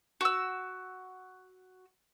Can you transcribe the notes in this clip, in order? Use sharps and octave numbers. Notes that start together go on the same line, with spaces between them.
F#4 E6